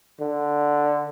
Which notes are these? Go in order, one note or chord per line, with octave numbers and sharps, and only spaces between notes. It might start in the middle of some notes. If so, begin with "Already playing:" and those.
D3